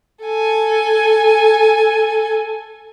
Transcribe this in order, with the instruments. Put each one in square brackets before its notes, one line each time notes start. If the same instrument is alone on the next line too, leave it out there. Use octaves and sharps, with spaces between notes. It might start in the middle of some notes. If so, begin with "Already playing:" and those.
[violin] A4 G#5